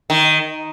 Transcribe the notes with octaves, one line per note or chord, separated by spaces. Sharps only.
D#3